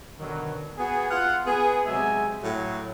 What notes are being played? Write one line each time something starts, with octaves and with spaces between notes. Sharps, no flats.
B2 D3 D#3 F#3
B3 F#4 G#4
F4 F5 F#5
B3 G#4
C3 F#3 G#3 E5 G#5
A2 F#3